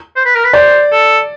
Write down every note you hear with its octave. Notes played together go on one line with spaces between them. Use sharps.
C5
B4
A#4
B4
C5 D5
A4